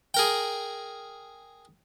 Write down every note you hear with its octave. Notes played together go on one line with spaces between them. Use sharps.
G#4 A#4 G5